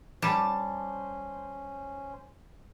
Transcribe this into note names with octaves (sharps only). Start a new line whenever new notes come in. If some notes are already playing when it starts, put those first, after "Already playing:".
G3 C#4 C5 A5 D6